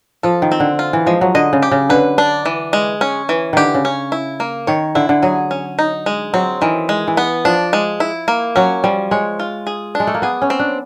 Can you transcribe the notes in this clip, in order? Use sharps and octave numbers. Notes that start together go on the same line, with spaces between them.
F3 A4
D#3
C4
D3
F4
E3
F3 G#3
F#3
D3 D#5
C#3
G4
C#3
D3 B4
D4
E3
G#3
C#4
E3
D3 D#3 G4
C#3
C#4
E4
A#3
D#3 C#5
D3 E4
D3
F#3 G#4
C#4
D#4
G#3
F#3 C4
D#3 E3
G#3
E3
B3
F3 D4
G#3
E4
A#3
F#3 C#4
F3 G3
G#3 C#5
F4
G#4
G#3 D4
A3
A#3
B3 G#4
C#4
C4
D4